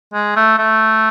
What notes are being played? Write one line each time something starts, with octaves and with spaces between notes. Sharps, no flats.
G#3
A3
A3